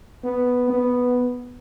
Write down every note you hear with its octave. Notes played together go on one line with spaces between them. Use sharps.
B3
B3